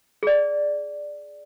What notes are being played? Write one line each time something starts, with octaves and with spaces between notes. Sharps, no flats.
G#4 D5